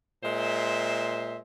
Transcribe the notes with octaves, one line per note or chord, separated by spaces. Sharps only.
A#2 G#3 C5 E5